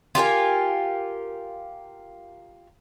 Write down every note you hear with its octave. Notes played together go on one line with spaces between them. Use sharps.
F4 G4 A#4 G#5